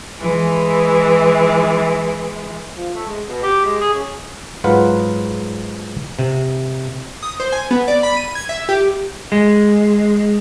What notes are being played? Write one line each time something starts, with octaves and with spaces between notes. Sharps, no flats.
E3 G#3
F3
A3
G#3
B2
G4
G#3
G#4
C#4
G#2 F#3 F4 B4 F#5
C3
D#6
C5
G#5
B3
D5
B5
D#7
G#6
E5
G4
G#3